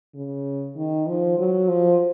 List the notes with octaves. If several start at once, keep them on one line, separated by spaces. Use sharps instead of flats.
C#3
D#3
F3
F#3
F3